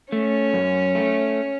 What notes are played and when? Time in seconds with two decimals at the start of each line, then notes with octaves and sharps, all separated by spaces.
0.12 A3 C#4
0.54 F#2
0.95 A3